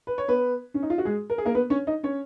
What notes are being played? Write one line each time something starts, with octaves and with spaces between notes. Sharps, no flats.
B4
C#5
B3 B4
C#4
D#4
F4
F#4
G#3 G#4
A#4
G#4
A#3 A#4
B3 B4
C#4 C#5
D#4 D#5
C#4 C#5